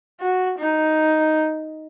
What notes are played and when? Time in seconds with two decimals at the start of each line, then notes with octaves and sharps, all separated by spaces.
0.20 F#4
0.59 D#4